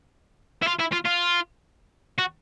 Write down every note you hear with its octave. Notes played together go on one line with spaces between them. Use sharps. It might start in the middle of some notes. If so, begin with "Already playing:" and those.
E4
F4
E4
F4
F4
F#4